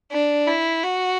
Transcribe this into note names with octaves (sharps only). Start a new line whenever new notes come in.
D4
E4
F#4